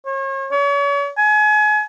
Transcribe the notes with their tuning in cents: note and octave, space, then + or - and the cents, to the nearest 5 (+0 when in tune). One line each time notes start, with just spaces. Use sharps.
C#5 -40
C#5 +40
G#5 +35